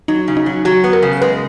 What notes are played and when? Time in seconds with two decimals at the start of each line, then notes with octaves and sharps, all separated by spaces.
0.08 F#3 D#4
0.28 C#3
0.37 D#4
0.46 F#3
0.65 F#3 F#4
0.84 B3
0.93 A#4
1.03 C#3
1.22 G#3 B4